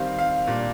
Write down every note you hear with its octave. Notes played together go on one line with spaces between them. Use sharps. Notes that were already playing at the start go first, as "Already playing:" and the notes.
Already playing: D#3 G3 C4 F5
F5
A#2 G3 D4